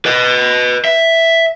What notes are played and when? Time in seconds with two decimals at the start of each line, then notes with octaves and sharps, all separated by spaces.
0.05 B4 D#5
0.85 E5